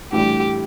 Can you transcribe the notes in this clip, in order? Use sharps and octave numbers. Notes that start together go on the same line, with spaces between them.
A2 E3 G3 D4 G4